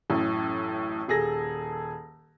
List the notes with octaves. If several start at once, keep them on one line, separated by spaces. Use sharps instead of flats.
A1 F#2 A2
D#1 G#4 A4 A#6